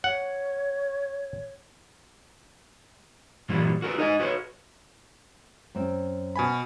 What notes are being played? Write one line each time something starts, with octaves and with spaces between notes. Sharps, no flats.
C#5 F#5
G2 A#2 E3 F#3 G3
F#4 A#4 B4
D#4 D#5 E5 G#5
F#4 B4 C#5
F#2 C4
B2 G#5 B5